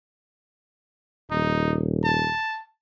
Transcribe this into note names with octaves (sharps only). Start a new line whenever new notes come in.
D#1 D#4
A5